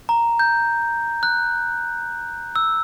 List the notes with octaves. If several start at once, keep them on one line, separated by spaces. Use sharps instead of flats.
A#5
G6
F#6
E6